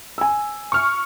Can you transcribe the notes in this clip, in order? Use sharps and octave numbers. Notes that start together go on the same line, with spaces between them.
G#5 E6
C#6 F6